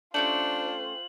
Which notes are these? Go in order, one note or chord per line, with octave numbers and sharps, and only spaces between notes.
A3 C#4 D4 F4 G4 C5 F#7